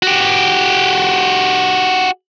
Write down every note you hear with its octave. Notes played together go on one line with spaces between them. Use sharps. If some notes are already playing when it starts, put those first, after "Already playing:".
F#4 G4